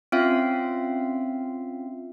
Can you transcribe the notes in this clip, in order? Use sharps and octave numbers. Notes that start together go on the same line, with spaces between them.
C4 C#4 F4 E5 F5